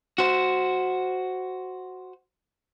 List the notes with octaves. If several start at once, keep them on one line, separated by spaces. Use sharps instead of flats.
F#4 C5